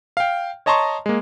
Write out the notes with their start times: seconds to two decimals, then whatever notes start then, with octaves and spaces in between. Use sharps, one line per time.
0.17 F5 G5
0.66 C#5 D#5 A5 A#5 C6 C#6
1.06 G#3 A#3